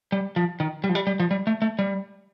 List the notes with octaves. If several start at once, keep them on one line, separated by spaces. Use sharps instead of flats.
G3
F3
D#3
G3
F3
G3
G3
F3
G3
A3
A3
G3